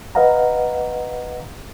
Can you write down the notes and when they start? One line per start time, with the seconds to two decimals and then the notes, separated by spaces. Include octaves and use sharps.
0.15 B4 D#5 F5 F#5 A#5